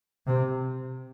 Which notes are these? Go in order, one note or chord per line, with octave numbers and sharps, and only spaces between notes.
C3